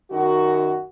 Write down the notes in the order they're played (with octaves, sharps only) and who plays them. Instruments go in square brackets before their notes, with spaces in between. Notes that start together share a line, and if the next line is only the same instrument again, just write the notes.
[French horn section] F#2 D#3 F#4